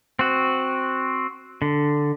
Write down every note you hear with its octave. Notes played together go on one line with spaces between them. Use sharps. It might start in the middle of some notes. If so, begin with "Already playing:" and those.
C4 F#4
D3